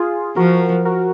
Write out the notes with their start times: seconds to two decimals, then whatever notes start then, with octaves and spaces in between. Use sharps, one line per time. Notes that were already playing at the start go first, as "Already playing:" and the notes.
Already playing: F4 G#4
0.36 F3 F#4 A#4
0.85 F#4 A#4